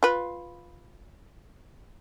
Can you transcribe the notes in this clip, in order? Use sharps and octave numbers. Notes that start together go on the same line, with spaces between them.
F4 B4